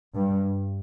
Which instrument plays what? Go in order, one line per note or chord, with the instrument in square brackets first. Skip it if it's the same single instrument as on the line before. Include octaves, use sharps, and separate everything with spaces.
[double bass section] G2